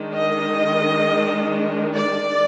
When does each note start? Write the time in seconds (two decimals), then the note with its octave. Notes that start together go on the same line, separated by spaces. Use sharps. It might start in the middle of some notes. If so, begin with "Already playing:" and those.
Already playing: D#3 G#3 D4
0.14 D#5
1.95 D5